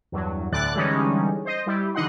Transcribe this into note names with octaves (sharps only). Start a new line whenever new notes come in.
E2 G2 F#3
D2 A2 D3 D5 F#6 A6
D3 E3 G3 G#3 C#4 D#4
C5 D#5
G3 E4 G4
D3 E3 D#4 D#5 F#5 C6